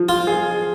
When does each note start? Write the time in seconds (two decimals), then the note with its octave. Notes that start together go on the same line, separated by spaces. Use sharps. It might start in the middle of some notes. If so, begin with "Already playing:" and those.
Already playing: F3
0.09 F4
0.27 G#4